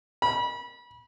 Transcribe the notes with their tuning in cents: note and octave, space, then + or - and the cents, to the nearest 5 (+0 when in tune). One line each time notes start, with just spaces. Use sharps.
B5 -30